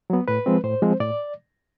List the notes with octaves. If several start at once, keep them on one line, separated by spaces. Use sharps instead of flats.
F#3 B3
A2 B4
F3 G#3 C4
A2 C5
F3 G#3 C4
A2 D5